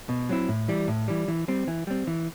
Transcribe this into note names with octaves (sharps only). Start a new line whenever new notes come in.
B2
F#3 C4 E4
A2
E3 G3
A2
E3 G3
E3
G3 C4
E3
G3 C4
E3